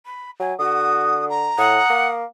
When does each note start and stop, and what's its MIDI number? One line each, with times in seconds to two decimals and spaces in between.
0.05 0.30 83
0.40 0.54 54
0.40 0.54 80
0.59 1.53 50
0.59 1.25 66
0.59 1.25 87
1.29 1.93 82
1.58 1.80 45
1.58 2.09 78
1.58 2.10 87
1.90 2.25 58